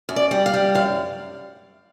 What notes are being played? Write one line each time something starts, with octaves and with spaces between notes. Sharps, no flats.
F#2
D5
G3
F5
G3
F#2 F5